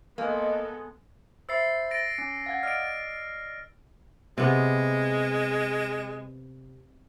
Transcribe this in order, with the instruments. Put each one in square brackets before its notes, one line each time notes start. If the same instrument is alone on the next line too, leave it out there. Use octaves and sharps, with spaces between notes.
[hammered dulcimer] G#3 D#5 [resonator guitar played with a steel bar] A#3 [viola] B3 A4
[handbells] C5 E5 B5 [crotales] E6 A6 C7
[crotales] A6 A#6 D7
[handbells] C#4 C#7
F5 F#5 G#6
[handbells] D5 D#5 [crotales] F6 D7
[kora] C3 B3 [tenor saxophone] G#3